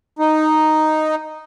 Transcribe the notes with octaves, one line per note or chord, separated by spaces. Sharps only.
D#4